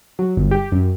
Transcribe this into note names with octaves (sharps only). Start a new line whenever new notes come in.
F#3
G1
G4
F#2